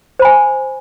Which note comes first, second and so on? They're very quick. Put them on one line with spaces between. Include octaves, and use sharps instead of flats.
C5 B5 G#5